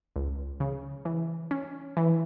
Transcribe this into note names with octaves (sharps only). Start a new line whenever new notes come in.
C#2
C#3
E3
C#4
E3